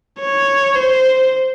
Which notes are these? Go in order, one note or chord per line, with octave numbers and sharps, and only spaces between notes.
C#5
C5